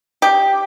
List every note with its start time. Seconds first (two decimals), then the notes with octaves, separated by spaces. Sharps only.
0.22 G4